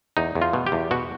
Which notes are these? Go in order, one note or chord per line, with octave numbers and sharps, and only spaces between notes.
E2 D#4
E2
F4
B2
G4
E2
B2 F#4